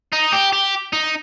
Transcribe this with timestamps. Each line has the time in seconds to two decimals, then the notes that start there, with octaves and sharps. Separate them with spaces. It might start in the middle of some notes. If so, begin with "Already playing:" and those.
0.13 D#4
0.33 G4
0.53 G4
0.93 D#4